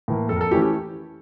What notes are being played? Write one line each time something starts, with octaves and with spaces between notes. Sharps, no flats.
A2 E3 A#3
F2 A4
A#4
A4
E3 A3 C#4 E4 G4
G4